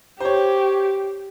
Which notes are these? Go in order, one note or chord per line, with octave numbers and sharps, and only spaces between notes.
G4 C5 C#5